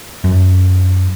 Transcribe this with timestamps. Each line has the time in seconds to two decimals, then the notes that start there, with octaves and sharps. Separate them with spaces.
0.24 F#2